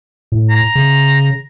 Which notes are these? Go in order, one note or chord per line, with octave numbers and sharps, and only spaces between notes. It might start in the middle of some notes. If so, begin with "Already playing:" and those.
A2
A#5
C#3